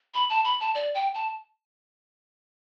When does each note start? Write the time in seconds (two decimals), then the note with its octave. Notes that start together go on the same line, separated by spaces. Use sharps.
0.14 B5
0.30 A5
0.45 B5
0.60 A5
0.75 D5
0.95 G5
1.15 A5